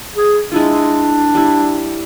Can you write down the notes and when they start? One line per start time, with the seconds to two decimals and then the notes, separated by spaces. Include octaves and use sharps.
0.16 G#4
0.51 G#3 D4 E4 F4
1.35 G3 E4